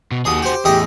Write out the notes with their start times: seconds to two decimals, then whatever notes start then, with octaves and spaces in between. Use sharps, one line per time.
0.11 B2
0.25 D#2 F#4 G#4 D#6
0.42 G4 C5
0.65 E2 A2 G4 G#4 D#5 E5